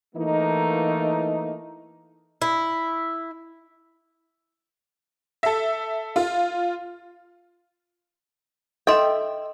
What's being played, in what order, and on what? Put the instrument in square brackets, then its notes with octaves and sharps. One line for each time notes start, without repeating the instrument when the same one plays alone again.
[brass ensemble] E3 A3 A#3 D#4
[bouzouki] E4
[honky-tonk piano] A4 E5
F4
[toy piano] A4 D#5 C6 [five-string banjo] E5 G5